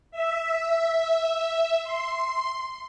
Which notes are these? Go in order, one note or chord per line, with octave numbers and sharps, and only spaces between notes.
E5
C6